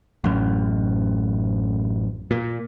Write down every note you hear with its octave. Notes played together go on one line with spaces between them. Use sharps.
A1 F#2
A#2